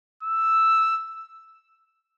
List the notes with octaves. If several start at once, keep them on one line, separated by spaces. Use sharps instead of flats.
E6